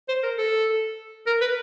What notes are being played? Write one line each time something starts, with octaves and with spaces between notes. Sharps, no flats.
C5
A#4
A4
A#4
B4